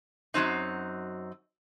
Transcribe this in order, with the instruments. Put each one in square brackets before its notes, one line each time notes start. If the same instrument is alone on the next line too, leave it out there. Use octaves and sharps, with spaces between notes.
[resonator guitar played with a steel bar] F#2 F#3 C4 D#4